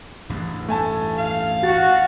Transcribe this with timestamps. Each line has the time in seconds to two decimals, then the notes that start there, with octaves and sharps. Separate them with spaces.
0.30 A1 E2 G2
0.69 A3 G#5 A5
1.17 F5
1.63 F#4 A6